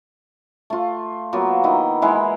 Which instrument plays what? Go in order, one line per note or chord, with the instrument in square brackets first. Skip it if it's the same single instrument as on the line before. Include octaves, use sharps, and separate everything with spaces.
[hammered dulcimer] A3 F4
F#3 A#3 B3 F4
D#3 E4 D#5
E3 G#3 E4 C5